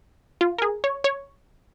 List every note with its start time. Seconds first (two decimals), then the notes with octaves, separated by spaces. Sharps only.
0.41 F4
0.58 A#4
0.62 G#4
0.84 C#5
1.04 C#5